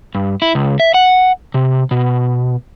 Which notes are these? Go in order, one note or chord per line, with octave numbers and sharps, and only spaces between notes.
G2
E4
C#2
E5
F#5
C3
B2